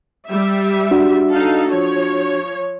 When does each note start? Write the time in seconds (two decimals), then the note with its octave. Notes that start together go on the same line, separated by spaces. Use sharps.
0.28 G3 E5
0.91 D4 F#4
1.31 D#4 A4 F5
1.70 F3 C#5